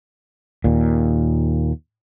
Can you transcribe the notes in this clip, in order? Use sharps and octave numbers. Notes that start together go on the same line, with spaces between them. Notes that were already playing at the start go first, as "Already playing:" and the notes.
D#2 A#2